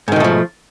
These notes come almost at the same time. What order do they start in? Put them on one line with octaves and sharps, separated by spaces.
G#2 D#3 B2 A3 F3